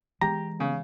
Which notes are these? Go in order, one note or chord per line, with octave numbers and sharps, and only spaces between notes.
E3 G#3 G4 A#5
C#3